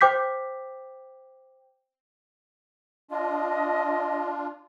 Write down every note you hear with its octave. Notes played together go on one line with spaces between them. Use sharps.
C5 G5 D6 G6 B6
D4 F4 D#5